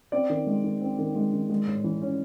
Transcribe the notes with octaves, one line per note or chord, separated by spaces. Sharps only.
C4 D5
D#3
G#3
D#3
C4
D#3
G#3
D#3
G#3
A2
E3
C#4